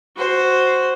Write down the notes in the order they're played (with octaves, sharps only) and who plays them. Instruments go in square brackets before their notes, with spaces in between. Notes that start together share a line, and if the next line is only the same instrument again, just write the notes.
[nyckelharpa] F#4 C5